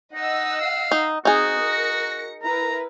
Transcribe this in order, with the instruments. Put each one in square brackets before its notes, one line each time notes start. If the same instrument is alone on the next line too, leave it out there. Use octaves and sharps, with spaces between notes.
[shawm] D#4 [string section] D#5 F#5 E6
[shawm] F5
[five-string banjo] D#4
[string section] C4 [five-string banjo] D#4 G#4 [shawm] F#4
[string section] A#4 A#6 C#7
[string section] E4 A#4 B4 [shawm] A#5